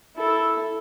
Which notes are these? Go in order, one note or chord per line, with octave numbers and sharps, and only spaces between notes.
E4 A4